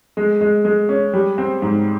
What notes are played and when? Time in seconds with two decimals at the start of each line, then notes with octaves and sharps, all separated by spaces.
0.17 G#3
0.41 G#3
0.65 G#3
0.89 C#4
1.13 G3
1.38 C4
1.62 G#2